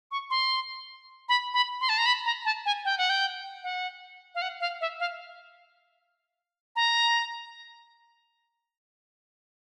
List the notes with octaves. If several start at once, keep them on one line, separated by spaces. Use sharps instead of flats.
C#6
C6
B5
B5
C6
A5
A#5
B5
A#5
A5
G#5
G5
F#5
G5
F#5
F5
F#5
F5
E5
F5
A#5